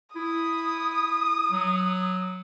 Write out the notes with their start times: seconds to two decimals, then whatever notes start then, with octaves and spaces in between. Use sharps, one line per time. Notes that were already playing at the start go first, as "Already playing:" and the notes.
0.16 E4 D#6
1.51 F#3